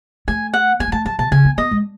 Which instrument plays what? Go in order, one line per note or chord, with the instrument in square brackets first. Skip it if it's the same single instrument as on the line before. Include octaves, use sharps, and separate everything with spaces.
[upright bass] A3 [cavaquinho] G#5
[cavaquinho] F#5
[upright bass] B3 [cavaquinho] G#5
[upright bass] G#3
[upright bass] A3 [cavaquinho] A5
[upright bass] F#3 [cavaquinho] A5
[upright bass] B2 [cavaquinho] A5
[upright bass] C#3 [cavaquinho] G#5
[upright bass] B3
[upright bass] B3 [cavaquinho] D#5
[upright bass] G#3